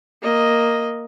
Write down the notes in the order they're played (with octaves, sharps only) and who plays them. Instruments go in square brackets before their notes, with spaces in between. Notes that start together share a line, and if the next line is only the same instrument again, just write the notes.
[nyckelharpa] A#3 D#5